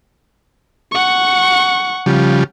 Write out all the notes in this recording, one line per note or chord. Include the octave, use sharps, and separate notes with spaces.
F#5 C#6
C#3 F3 G3